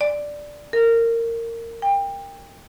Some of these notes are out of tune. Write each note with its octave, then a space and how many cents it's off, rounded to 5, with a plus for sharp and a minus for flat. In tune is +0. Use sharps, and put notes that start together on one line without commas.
D5 +0
A#4 -20
G5 +25